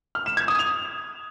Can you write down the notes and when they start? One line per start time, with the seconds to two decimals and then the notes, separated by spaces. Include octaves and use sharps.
0.15 F6
0.26 E7
0.37 G#6
0.48 D#6
0.59 F7